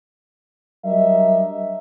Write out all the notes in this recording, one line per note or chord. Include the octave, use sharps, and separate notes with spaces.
F#3 G3 D4 A#4 D#5 E5